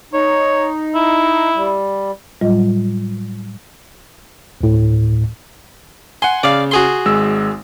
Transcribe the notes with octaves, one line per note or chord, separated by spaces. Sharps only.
D#4 C#5
E4
G3
A2 F#3 G3 F4 D#5
D2 A2
F#5 G#5 C6
C#3 D5 F5
F#4 G#4 C6
G#1 G#3 E6